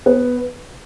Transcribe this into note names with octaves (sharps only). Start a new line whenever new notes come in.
B3